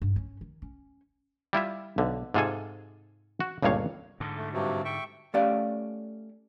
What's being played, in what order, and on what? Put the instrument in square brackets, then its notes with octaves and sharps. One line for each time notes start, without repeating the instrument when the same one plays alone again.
[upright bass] G2
C#4
D#3
C#4
[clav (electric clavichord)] G3 E4 F4 E5
B1 D3
G#2 C3 F4 G#4 A4 G#5
F#4
G1 C#2 G2 A#2 C#5 F5
[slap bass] G#2 D3
[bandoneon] A3
G2 C3 F#3
E5 G5 C#6
[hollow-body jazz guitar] A3 C#4 G4 D5 F5